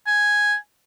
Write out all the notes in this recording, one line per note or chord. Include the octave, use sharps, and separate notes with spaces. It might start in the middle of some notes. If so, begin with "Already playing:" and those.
G#5